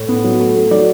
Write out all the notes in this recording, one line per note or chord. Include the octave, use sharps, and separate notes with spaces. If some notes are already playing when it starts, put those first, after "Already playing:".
Already playing: A2 C#5
B3
F#3
A3
A3
F#3 D5